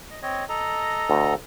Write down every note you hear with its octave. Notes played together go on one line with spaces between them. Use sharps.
D#5
C4 C#5 D#5
A4 D#5 A#5
D2